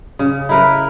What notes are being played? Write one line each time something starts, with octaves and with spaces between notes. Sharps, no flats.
C#3
E4 A#4 B4